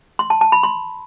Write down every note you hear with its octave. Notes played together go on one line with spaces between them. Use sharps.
C6
A5
A5
B5
C6